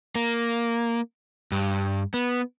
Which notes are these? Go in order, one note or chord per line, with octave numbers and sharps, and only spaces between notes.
A#3
G2
B3